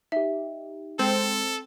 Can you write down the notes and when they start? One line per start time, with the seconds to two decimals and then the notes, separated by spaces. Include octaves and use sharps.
0.12 D#4 G4 E5
0.99 G#3 C4 A4